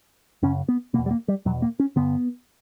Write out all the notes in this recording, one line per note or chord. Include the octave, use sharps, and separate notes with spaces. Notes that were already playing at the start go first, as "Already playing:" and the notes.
F#2 C#3 C#4
B3
E2 B2 A#3
G3
A#3
G3
E2 B2 F#3
A#3
C#4
G2 D3 B3